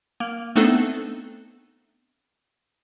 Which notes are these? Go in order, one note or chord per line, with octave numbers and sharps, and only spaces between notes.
A#3
A3 B3 C4 D4 D#4 A4